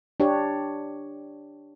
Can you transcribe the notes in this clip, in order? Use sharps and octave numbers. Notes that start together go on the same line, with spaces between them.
D4 G4 C#5